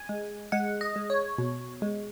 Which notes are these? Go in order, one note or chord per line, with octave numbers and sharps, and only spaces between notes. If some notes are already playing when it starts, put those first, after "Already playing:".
Already playing: G#5
G#3
G#3 F#5
D#5
G#3
C#5
B2
G#3